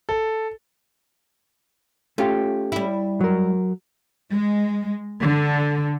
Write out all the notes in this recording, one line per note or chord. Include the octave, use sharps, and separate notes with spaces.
A4
A3 C#4 F4 G4
G3 E4
F#3 A#4
G#3
D3